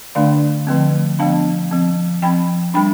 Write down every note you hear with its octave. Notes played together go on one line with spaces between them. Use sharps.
D3 A3 D4 D5 F5
D3 F3 A3 C4
F3 B3 D4 F5 A5
F3 C4
F3 C4 G5 B5
G3 D4 G5 B5